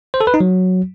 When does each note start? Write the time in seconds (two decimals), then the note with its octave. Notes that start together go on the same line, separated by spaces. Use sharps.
0.14 C5
0.21 A4
0.27 B4
0.34 D#4
0.40 F#3